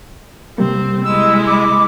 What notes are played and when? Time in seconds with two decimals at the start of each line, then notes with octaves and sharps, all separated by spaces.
0.58 C3 G3 A#3 C4
1.04 G#3 E4 E6
1.47 D6